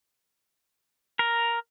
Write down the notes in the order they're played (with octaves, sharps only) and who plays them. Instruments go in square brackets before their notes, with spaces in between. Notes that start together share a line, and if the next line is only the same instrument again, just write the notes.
[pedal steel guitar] A#4